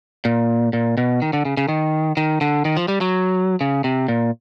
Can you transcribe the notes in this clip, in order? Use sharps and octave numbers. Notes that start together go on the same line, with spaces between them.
A#2
A#2
B2
D#3
D3
C#3
C#3
D#3
D#3
D3
D#3
F3
G3
F#3
C#3
C3
A#2